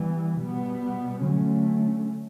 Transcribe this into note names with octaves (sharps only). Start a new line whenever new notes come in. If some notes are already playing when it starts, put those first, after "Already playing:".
Already playing: E3 G3 B3
B2 G3 B3
D3 F#3 A3 C#4